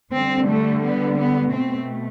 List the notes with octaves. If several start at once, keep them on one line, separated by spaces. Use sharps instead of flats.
D3 G3 C4
A3
B3
B3
B2 A3 C4